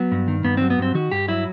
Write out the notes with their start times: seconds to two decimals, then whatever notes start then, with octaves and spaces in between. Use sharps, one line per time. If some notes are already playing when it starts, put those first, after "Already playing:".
Already playing: F#3 B3
0.12 G2
0.28 D#3
0.44 G2 B3
0.57 F#3 C4
0.70 B3
0.78 G2 C4
0.94 D#3 F#4
1.11 G2 G4
1.28 F#3 E4